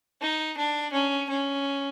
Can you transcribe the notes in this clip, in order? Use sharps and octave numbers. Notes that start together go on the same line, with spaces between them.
D#4
D4
C#4
C#4